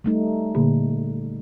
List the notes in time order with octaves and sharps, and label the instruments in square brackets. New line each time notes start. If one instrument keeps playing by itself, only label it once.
[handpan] G3 A3 D#4
[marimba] A#2 D3 A#3